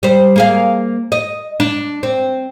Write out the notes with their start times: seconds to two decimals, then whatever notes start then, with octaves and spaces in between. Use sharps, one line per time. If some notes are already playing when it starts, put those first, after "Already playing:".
0.03 G3 C5
0.36 A#3 G#4 F5
1.12 D#5
1.60 D4
2.03 C4